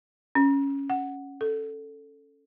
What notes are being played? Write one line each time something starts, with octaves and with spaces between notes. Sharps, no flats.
C#4
F#5
A4